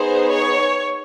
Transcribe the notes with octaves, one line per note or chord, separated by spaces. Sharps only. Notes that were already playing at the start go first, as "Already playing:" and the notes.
Already playing: B3 D#4 G#4 C5
C#5